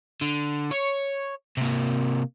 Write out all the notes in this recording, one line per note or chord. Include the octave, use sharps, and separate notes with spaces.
D3
C#5
C3 A#3